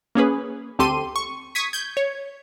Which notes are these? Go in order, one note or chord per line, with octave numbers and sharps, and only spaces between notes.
A#3 C#4 G#4 B4
D2 C4 G4 A4 C6 D#7
C#6
C#6 D#6 G#6 B6
G6 G#6
C#5